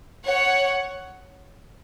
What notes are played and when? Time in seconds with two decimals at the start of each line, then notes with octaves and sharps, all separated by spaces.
0.25 C#5 F#5